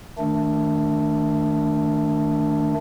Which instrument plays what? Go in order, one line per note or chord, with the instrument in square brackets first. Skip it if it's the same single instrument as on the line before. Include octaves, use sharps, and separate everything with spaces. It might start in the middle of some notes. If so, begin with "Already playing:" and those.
[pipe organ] D#3 A3 D4